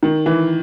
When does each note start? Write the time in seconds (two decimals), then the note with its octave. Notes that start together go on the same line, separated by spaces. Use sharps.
0.03 D#3
0.26 E3